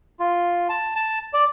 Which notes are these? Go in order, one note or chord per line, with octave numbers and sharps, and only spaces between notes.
F4
A5
A5
D5